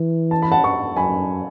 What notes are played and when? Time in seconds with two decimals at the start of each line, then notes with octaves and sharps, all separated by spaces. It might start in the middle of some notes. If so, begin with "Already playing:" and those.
Already playing: E3
0.31 A5
0.42 B5
0.52 F#5 A5
0.63 A5 C#6
0.97 F#2 G#5 B5